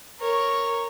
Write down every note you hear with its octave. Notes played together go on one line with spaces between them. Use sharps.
A#4 C#5